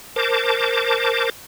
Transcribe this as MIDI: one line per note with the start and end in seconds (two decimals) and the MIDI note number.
0.16 1.30 70
0.16 1.30 72
0.16 1.30 81
0.16 1.30 86